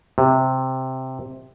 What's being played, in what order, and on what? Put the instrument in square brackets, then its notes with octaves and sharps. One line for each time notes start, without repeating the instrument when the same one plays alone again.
[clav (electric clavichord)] C3